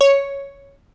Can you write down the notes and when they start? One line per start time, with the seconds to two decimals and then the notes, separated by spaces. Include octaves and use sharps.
0.01 C#5